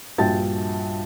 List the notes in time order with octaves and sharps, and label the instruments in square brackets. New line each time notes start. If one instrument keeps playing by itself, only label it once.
[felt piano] A#1 G2 F#4 G5 A5 A6